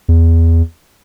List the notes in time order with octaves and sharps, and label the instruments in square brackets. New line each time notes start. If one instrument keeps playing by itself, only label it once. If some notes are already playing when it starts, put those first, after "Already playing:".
[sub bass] E2